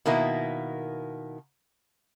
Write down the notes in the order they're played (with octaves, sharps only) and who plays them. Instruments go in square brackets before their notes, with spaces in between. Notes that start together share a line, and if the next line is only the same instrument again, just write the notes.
[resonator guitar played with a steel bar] B2 D#3 A#3 E4